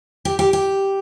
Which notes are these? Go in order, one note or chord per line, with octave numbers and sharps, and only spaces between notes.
G4
G4
G4